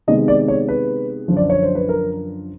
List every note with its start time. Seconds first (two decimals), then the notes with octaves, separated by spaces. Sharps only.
0.08 C3 D#3 G#3 B3 D#5
0.28 D5
0.48 C#5
0.68 B4
1.28 F#2 D3 F3
1.37 D5
1.50 C#5
1.63 C5
1.75 B4
1.89 A#4